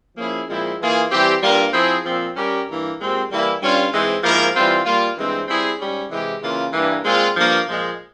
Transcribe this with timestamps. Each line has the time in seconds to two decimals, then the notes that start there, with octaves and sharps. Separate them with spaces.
0.18 F3 A#3 C#4 E4 G#4
0.48 A#2 F3 G#3 C4 E4
0.80 E3 A#3 F4 G#4
1.11 E3 G3 C4 G4
1.43 G2 G3 A#3 F4 A#4
1.73 F3 C4 E4 G#4
2.05 A#2 F3 C4
2.35 G3 C#4 G4 A#4
2.67 G2 E3 A#3
2.98 A#2 G#3 C4 G4
3.30 E3 G3 A#3 E4
3.61 G2 G3 C#4 F4
3.92 G#2 E3 G#3 C4
4.23 G#2 F3 A#3 E4 A#4
4.54 E3 G3 C4 F4
4.85 G3 A#3 F4
5.17 G2 E3 G#3 C4
5.47 G3 C4 E4 G#4
5.79 G#2 G3 C#4
6.11 C3 E3 G#3 E4 G4
6.42 C#3 E3 A#3 F4
6.73 G2 E3 A#3
7.04 A#2 G#3 C4 F4
7.35 G2 F3 A#3
7.66 A#2 F3 G#3